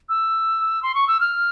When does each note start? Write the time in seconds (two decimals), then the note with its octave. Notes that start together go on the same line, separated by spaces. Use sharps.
0.09 E6
0.83 C6
0.95 C#6
1.08 E6
1.20 F6